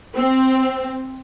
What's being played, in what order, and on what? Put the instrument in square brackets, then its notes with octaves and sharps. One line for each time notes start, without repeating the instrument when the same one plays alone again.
[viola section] C4